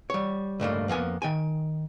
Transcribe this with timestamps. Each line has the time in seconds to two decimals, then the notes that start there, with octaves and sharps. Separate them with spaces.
0.10 G3 C#5
0.60 C#2 G2 A3 A#3
0.88 F2 A#3 B3 G#5
1.22 D#3 G5 G#5